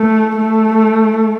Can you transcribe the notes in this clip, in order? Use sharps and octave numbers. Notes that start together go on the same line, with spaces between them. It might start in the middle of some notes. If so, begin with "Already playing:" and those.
Already playing: A3
A3